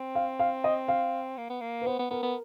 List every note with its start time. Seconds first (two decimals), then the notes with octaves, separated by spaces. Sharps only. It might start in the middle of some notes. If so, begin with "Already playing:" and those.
Already playing: C4
0.15 F5
0.39 F5
0.64 D#5
0.88 F5
1.37 A#3
1.50 B3
1.61 A#3
1.81 B4
1.86 B3 C5
1.99 B3
2.10 B3 A#4
2.22 B3